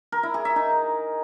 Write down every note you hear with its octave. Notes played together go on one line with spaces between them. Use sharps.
A#4
E4
G#4
E5
D#4